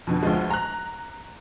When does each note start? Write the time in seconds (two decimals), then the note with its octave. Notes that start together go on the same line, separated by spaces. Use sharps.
0.07 F2 B2 D3
0.23 D2 F3 G#3
0.50 A#5 F#6